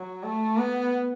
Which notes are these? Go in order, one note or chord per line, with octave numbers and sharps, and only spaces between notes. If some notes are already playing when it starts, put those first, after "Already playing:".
Already playing: F#3
A3
B3